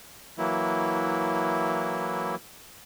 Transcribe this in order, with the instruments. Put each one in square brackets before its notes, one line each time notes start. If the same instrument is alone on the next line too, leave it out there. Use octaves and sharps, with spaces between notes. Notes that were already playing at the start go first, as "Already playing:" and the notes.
[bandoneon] E3 F#3 A#3 E4